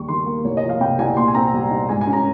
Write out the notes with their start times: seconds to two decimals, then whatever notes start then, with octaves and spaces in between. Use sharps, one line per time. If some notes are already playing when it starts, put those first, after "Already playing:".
Already playing: D#2 G3 C#6
0.08 D#3 C6
0.26 A#3
0.45 C2 C#5
0.57 D#5
0.63 F3
0.69 F5
0.80 C3 G5
0.98 C2 G#5
1.16 A#2 C6
1.28 G#5
1.35 C4 A#5
1.54 G3
1.71 D#4
1.89 G#2 G#5
2.01 G#5
2.07 C#4
2.13 A#5